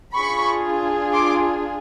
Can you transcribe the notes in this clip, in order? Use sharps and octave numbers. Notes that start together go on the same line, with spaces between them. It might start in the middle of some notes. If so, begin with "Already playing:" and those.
D4 F4 G#4 B5 C#6
C6 D6